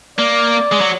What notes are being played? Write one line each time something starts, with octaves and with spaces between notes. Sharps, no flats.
A#3 D5
G#3
F#3